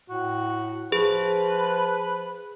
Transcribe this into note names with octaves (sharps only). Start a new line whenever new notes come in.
A2 F#4
F3 G#4 B4